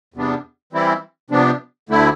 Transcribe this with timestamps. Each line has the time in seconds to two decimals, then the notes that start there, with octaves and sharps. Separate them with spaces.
0.14 E2 C3 G3 B3 D4
0.73 E3 G3 C4 E4
1.30 C3 F3 B3 D4
1.89 D2 D3 A3 E4